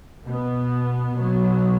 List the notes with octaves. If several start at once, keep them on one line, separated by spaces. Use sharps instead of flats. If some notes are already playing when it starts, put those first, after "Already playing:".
B2 B3
B2 F#3 B3